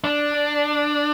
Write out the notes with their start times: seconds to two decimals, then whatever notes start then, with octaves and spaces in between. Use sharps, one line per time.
0.04 D4